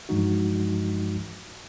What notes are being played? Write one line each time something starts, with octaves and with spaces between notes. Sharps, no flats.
G2 E3 F3 G#3 D#4 F#4